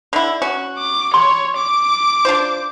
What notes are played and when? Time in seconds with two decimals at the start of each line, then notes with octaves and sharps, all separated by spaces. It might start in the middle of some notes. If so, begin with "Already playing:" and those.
0.13 D3 E4
0.42 C#4 F#4
0.78 D6
1.14 C#5 C6
1.57 D6
2.25 D4 F4 C5